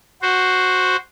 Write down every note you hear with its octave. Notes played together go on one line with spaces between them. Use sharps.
F#4 C5